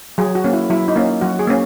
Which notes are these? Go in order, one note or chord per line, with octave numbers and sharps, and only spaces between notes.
F#3 G#4
F#4
A#3 C#4
E4
F#3 E4
D#4
A#3 C#4
F#3 F#4
G#4
A#3 C#4